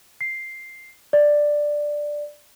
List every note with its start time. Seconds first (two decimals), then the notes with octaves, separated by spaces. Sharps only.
0.21 C7
1.13 D5